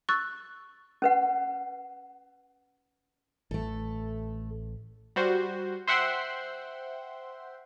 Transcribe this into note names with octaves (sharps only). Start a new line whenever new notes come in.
C#6 E6 F#6 A6
C#4 B4 F#5
A1 A3 A4
G3 F#4 C5
C5 E5 F#5 G5 C6